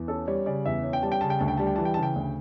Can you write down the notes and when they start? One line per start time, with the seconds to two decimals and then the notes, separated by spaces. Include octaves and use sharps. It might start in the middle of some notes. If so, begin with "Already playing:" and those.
Already playing: E2
0.08 C#4 A4
0.27 G3 C#5
0.46 C#3 D5
0.66 E2 E5
0.83 C#4
0.93 G5
1.03 G3 A5
1.12 G5
1.21 C#3 A5
1.30 G5
1.39 D2 A5
1.48 G5
1.57 G3 A5
1.67 G5
1.76 E3 A5
1.85 G5
1.94 C#3 A5
2.03 G5
2.16 D2